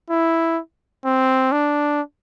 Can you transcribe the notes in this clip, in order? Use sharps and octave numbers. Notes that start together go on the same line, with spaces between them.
E4
C4
D4